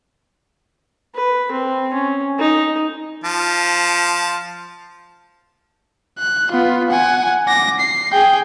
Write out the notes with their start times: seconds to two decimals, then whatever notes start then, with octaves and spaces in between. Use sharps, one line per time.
1.15 B4
1.52 C4
1.94 C#4
2.39 D#4
3.24 F3 A5
6.18 F#6
6.51 B3 F4
6.90 F#5 G#5
7.47 D6 A#6
7.80 C7
8.12 G#4 G5